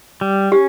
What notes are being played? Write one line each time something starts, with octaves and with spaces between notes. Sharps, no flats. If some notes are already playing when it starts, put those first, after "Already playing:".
G3
C#4 G4